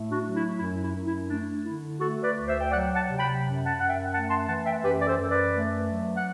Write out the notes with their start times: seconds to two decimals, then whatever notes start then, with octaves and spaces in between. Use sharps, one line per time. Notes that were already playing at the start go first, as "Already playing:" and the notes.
Already playing: A2 A3
0.11 D4 F#4
0.24 F#3
0.36 E4
0.59 F#2 E4
0.82 E4
0.94 F#2
1.06 E4
1.29 A3 D4
1.65 D3 E4
2.00 A3 F#4 A4
2.23 B4 D5
2.35 D2
2.48 C5 E5
2.61 G5
2.71 F#3 D5 F#5
2.94 F#5 A5
3.06 C3
3.18 G5 B5
3.42 F#2
3.65 F#5 A5
3.77 F#2 F#5
3.89 E5 G5
4.12 A3 F#5 A5
4.30 A5 C6
4.48 E3 F#5 A5
4.65 E5 G5
4.83 F#2 G4 B4
5.00 D5
5.07 A4 C5
5.19 F#2
5.30 B4 D5
5.54 A3
5.90 F#3
6.16 F#5